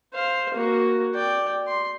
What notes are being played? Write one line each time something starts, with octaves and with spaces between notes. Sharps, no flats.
C5 F5
A#3 F#4
D5 G5
C6